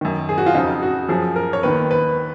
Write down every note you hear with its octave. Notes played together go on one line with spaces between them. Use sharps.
F#2 D#3
G#4
F#4
F4
F2 C#3 F3 D#4
F#4
F#2 F3 G#4
A#4
C#5
D#2 D#3 B4
B4